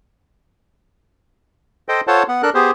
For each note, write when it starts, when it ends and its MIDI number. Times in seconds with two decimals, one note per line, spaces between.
1.89 2.01 69
1.89 2.01 72
1.89 2.01 75
1.89 2.01 79
2.07 2.23 65
2.07 2.23 69
2.07 2.23 72
2.07 2.23 73
2.07 2.23 78
2.07 2.23 81
2.28 2.42 59
2.28 2.42 78
2.43 2.50 62
2.43 2.50 69
2.43 2.50 70
2.43 2.50 90
2.54 2.71 59
2.54 2.71 67
2.54 2.71 68
2.54 2.71 72